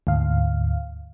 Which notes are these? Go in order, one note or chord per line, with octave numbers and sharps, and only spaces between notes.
D2 G#2 F5